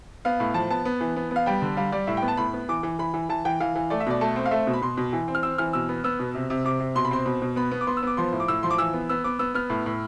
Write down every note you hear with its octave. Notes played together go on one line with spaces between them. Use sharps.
B3 F5
A2
F3 A5
B3 A5
B3
E3
B3
B3
F5
G3 G5
D3
G3 F5
G3 D5
A2 E5
G5
B3
A5
A2 B5
B3
E3 D6
E3
E3 B5
E3
E3 A5
E3 G5
E3 F5
E3
A3 D5
E5
B2 D5
A3 A5
C4
F5
A3 E5
B2
B5
B2 C6
B2
E3
C4
F6
C4 E6
E3 F6
B2 E6
B3
B3 E6
B2
C3
C3
C3 D6
C3
B2 C6
B5
C4 C6
B2 B5
B2
B3 B5
B3
D6
B3 C6
E6
B3 D6
F3 C6
A2
D6
A2 E6
F3 C6
D6
E3 E6
B3
B3 E6
B3 D6
B3 E6
B3 F6
A2
A2